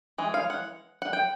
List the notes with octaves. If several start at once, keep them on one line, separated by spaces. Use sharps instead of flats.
E3 G#3
F5
F#5
F#5
G5